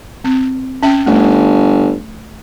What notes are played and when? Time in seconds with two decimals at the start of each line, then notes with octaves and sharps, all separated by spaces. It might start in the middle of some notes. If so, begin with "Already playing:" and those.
0.24 C4
0.83 C#4 E5 G5
1.06 G1 A3